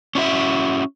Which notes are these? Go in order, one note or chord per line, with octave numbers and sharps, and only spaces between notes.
C#4 D4 E4 F#4 E5